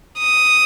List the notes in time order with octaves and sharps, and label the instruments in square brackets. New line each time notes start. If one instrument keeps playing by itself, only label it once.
[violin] D#6